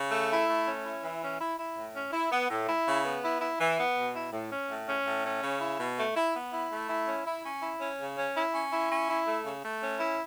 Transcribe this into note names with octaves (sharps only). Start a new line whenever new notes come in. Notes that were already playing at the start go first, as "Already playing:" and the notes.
Already playing: C#3
A3
E4
A3
C#4
E4
E3
C#4
E4
E4
A2
C#4
E4
B3
A2
E4
C#3
B3
E4
E4
E3
B3
B2
E4
A2
C#4
A2
C#4
A2
C#4
C#3
E4
B2
A3
E4
B3
E4
A3
E4
C#4
E4
C#4
E4
C#4
C#3
C#4
E4
C#4
E4
C#4
E4
A3
C#3
A3
C#4
E4